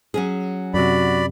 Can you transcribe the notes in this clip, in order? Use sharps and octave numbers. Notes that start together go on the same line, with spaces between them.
F#3 C#4 G#4
F#2 C3 F#4 D5 B5